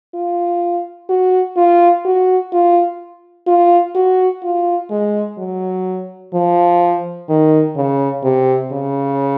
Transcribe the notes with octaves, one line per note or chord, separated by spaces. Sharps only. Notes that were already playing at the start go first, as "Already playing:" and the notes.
F4
F#4
F4
F#4
F4
F4
F#4
F4
G#3
F#3
F3
D#3
C#3
C3
C#3